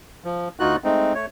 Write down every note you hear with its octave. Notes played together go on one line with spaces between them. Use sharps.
F3
D2 D#4 F4 F#4 F#6
G#3 A3 C4 D#4
A3 C#5